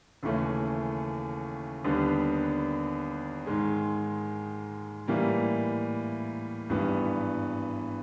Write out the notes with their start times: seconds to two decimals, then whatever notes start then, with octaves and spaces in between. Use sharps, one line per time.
0.23 D#2 C#3 E3 A3 C#4
1.84 D#2 D3 G3 B3 D4
3.46 G#2 D#3 G#3
5.08 A2 E3 G3 A#3
6.69 G#1 G2 E3 G3 B3